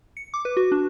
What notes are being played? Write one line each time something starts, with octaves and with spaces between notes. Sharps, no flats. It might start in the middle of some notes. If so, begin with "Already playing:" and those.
C#7
D6
B4
F#4
D4